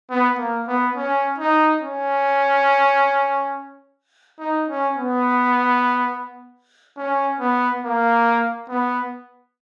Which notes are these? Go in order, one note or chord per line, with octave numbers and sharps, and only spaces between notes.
B3
A#3
B3
C#4
D#4
C#4
D#4
C#4
B3
C#4
B3
A#3
B3